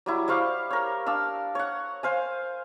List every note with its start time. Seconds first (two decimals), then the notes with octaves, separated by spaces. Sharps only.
0.06 F#3 G3 E4
0.28 G3 C5 F5 C#6
0.71 A#4 C#5
1.06 D4 F5 E6
1.55 C#5 F#5
2.03 C5 F5 G#5